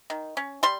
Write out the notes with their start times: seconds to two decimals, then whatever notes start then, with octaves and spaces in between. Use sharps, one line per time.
0.10 D#3
0.37 C#4
0.63 G3 C6